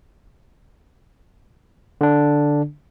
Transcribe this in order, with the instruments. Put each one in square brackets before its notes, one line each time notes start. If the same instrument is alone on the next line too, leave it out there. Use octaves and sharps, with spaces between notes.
[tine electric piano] D3 D4